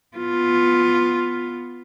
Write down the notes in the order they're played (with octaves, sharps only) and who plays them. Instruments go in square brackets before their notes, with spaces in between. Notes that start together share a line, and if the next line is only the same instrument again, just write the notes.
[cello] B3 F4